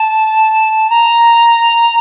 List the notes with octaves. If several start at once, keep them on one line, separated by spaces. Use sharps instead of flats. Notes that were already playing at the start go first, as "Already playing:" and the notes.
Already playing: A5
A#5